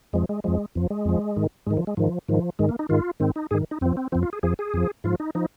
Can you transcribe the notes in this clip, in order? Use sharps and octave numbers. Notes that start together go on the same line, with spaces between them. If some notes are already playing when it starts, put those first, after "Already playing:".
F2 F3 G#3
G#3
F2 F3 G#3
F2 F3
G#3
F2 F3
G#2 D#3
G#2 D#3 G#3
F3
G#3
G#2 D#3 F3
G#2 D#3 F3
G#2 D#3 G#3
A#3
D#4
G#2 D#3 F4
G#2 D#3 C4
D#4
G#2 D#3 G#4
D#4
F2 F3 C4
C4
F2 F3 C4
F4
G#4
F2 F3 G#4
G#4
F2 F3
G#2 F3 F4
D#4
F3 D#4